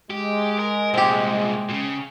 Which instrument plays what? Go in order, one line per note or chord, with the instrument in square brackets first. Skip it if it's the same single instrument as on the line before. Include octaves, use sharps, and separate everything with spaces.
[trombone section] G#3 [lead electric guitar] G4
[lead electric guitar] A#4
[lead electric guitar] C2 A#2 [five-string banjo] C4 G4
[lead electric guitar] A#2 C#3